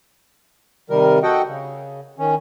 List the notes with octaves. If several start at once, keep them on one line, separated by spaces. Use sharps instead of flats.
C3 D#3 G3 A#4
F#4 A4 D#5 F#5 G5
C#3
D#3 C#4